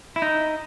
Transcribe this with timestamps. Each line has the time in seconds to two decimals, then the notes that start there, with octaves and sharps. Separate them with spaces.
0.16 E4
0.22 D#4